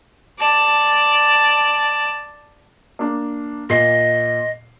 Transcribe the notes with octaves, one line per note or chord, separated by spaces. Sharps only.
D5 A5
A#3 D4
A#2 D#5 C7